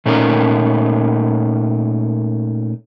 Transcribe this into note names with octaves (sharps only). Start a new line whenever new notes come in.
A#2 A3 C#4 D#4 A#4